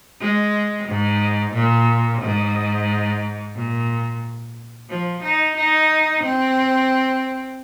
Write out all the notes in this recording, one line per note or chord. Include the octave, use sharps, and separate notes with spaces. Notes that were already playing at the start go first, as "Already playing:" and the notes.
G#3
G#2
A#2
G#2
A#2
F3
D#4
D#4
C4